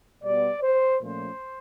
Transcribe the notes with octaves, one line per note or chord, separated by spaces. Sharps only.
B2 G3 B3 D5
C5
A#2 F3 A3 C#4 C5